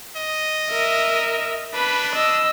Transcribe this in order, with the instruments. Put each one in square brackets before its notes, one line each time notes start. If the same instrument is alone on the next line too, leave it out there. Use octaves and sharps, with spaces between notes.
[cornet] D#5
[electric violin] A#4 E5
[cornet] D4 [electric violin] B4 B5
[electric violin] D#5 E6